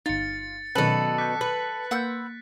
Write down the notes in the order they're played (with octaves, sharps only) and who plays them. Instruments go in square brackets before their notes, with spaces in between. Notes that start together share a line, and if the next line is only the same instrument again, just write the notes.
[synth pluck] G1 D#4 [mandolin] F4 [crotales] A6 C#7
[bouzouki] B2 B4 [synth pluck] D#3 F#3 C#4 [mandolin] A4 D5
[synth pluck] D6 G6 [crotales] F#6 B6
[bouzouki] B4
[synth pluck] A#3 C6 [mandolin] F#5 E6 G6